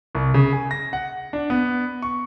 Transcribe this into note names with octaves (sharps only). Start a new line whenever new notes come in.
C2
C#3
G#5
A#6
F#5
D4
B3
C#6